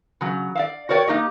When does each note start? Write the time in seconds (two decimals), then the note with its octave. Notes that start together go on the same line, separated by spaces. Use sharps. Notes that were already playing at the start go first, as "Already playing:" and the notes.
0.21 C#3 F#3
0.55 D5 E5 F5
0.89 F#4 A#4 C#5 D5 G5
1.07 A#3 D#4 G4 D#5